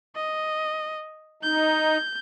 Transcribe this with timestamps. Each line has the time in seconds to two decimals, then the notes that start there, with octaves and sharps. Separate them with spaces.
0.16 D#5
1.43 D#4 G6